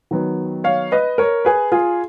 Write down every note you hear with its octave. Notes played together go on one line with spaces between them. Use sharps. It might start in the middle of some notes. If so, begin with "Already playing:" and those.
D#3 F#3 B3
C#5 F5
B4 D#5
A#4 C#5
G#4 B4
F4 G#4